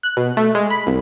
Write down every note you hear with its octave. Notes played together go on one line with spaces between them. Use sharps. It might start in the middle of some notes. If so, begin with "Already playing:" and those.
F#6
B2
A3
G#3
B5
C2